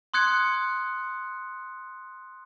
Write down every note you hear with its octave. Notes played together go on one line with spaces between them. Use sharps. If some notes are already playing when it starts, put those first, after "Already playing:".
C6 D#6 F#6 G#6 C#7